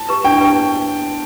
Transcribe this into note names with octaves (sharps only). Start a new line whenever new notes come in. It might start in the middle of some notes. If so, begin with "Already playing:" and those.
Already playing: A5
G4 B4
D4 G5
G4 B4